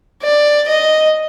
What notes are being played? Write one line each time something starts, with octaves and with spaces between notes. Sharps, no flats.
D5
D#5